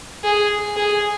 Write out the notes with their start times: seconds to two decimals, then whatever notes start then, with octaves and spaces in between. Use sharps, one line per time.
0.24 G#4
0.77 G#4